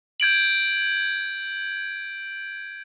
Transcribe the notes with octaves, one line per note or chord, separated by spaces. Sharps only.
G6 G#6 D7 F#7